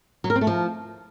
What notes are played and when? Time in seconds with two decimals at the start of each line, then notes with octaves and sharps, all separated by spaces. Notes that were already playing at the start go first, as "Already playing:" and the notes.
0.24 F#3
0.30 A#4
0.36 C4
0.41 A3
0.47 F3